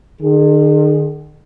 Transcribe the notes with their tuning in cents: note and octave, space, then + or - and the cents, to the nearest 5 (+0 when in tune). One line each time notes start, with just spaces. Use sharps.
D#3 -45 G#4 +0